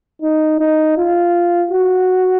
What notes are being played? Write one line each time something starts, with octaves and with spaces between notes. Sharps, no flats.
D#4
D#4
F4
F#4